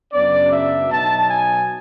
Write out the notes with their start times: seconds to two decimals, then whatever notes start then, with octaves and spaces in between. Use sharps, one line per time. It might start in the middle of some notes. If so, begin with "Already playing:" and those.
0.13 F#2 C#3 F#3 B3 D4 D5
0.51 E5
0.89 B2 F#3 B3 D#4 A5
1.28 G#5